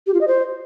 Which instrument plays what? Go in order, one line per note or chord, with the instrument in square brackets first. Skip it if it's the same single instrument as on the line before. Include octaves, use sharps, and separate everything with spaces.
[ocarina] G4
F4
D#5
C5